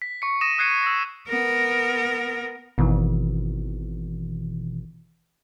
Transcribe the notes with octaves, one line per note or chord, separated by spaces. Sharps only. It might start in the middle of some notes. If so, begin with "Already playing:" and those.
B6
C#6 C#7
D#6 A#6 D#7 E7
D#6 F#6 G#6 C7 C#7 D#7
E6 A#6
B3 A#4
G#1 B2 D#3 E3